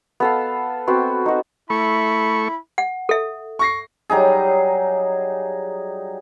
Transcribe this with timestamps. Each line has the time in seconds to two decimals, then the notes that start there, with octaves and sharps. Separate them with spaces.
0.20 B3 A4 F5
0.87 B3 C4 F#4
1.26 D#4 F#4
1.70 A3 E4 B5 C#6
2.78 F#5
3.09 A4 E5
3.59 C#6 A#6 C7
4.10 F#3 G3 D#4 G#4